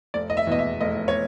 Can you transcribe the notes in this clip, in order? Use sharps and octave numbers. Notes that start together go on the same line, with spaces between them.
F1 D5
D#5
E5
E2 B2 D#5
E5
F1 D#5
C#5